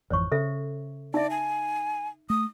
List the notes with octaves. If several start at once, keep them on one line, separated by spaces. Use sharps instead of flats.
G#1 F2 E3 C5 C#5 C#6
C#3 A4 C5 E5
D#4 D5 E5
G#5
A3 D#6